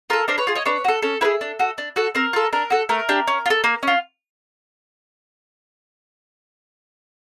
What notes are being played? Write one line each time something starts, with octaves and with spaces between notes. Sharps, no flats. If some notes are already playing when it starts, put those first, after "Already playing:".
F4 A4 A#4
D4 A#4 C5
B4 C#5
F4 G#4
C#5 D#5
D4 B4 C#5
F#4 A4
C#4 A4
E4 G#4 A4 B4
D4
F#4 A4
D4
F#4 A4
C4 A#4
F4 A4
D4 A#4
F#4 A4
A3 A#4
D4 G4
C#4
F4
A4
A#3
C#4 F4